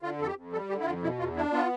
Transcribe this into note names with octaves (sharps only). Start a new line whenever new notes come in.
D3 F4
F2 A4
G4
F2
G3 A4
D3 G4
E4
F2 F4
B2 E4
E2 F4
D4 E4
B3 F4